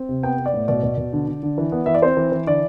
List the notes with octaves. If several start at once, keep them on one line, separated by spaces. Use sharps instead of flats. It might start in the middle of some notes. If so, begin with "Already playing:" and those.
Already playing: C4
C3
B3 G5
B3
D5
A2
B2 D5
B2
B2
D3
D3
D3
E3
B3
E3 E5
D5
C4 C5
E3
E3
D3 D5